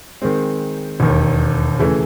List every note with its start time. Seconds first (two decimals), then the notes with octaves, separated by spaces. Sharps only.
0.22 D#3 G#3 C4
1.00 E1 D#2 D#3
1.79 C#3 E3 A3